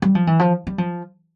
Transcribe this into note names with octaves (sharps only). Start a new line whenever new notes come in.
G3
F3
E3
F3
G3
F3